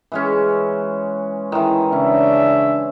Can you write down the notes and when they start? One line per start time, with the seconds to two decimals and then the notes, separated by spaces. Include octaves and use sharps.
0.12 E3 G#3 C#4
1.52 D#3 E3 E4
1.92 C#3 C#4 D4 E5